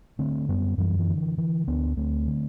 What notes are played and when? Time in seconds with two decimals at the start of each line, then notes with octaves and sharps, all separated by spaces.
0.19 D3 A3 C4
0.49 F#2 G3 B3
0.78 F#2 E3 G3
0.99 E3
1.08 D3
1.18 E3
1.37 D3 E3
1.68 D2 B3 D4
1.97 D2 A3 C4
2.27 D3